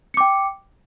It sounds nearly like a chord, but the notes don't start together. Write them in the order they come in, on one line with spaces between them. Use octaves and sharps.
C#7 D6 G5